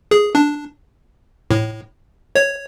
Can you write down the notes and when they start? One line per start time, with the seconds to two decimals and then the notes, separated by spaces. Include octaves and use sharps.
0.11 G#4
0.35 D4
1.51 A2
2.35 C#5